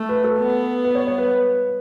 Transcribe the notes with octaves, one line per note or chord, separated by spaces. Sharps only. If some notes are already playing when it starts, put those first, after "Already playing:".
Already playing: A3
B4
A4
B3
B4
C#5
C#5
B4